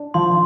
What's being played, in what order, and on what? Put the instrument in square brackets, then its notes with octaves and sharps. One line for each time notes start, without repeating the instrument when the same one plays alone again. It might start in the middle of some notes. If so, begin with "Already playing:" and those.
Already playing: [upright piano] D4
[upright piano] F3 [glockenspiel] C6